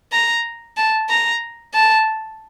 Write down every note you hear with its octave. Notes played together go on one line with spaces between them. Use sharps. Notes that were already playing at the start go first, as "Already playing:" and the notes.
A#5
A5
A#5
A5